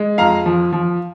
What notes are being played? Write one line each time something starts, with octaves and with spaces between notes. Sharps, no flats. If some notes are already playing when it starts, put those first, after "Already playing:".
Already playing: G#3
F2 F5 A#5
F3
F3